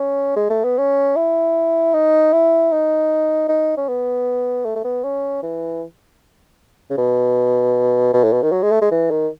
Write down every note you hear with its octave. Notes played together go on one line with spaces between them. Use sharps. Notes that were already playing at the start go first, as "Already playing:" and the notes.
Already playing: C#4
G#3
A3
B3
C#4
E4
D#4
E4
D#4
D#4
C#4
B3
A3
A3
B3
C#4
E3
C#3
B2
B2
A2
B2
D#3
F#3
G#3
A3
G#3
E3
D#3